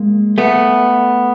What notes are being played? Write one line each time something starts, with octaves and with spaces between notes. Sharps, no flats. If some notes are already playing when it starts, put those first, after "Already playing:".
Already playing: G#3 A#3
A3 B3